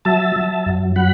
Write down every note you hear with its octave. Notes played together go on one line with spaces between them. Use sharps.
F#3 E5 A5
F#3
F#2
F#3 F#5 B5